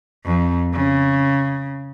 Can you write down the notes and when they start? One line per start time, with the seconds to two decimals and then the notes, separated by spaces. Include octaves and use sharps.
0.25 F2
0.74 C#3